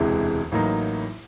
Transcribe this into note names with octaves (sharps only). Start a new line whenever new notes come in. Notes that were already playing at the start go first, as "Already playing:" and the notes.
Already playing: E1 D2 C3 E3 G#3
A1 A2 F#3 A#3 D#4